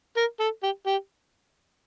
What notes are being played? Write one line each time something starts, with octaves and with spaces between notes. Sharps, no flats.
A#4
A4
G4
G4